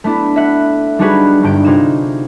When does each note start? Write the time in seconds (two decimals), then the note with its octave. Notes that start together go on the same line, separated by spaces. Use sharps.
0.04 A3 B3 D4 E4
0.36 E5 F#5
0.99 G3 D4 D#4 F#4 G#4 B4
1.43 G1 G2 G5 D7
1.65 C3 D#4 F4 G#4 E7